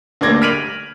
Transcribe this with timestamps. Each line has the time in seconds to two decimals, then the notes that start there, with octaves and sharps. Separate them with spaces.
0.21 D2 A#3 D5 G#6 A#6
0.42 F6 B6 D7 D#7 F7 F#7